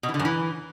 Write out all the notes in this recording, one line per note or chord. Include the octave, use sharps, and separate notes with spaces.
B2
E3
D3
F#2
E3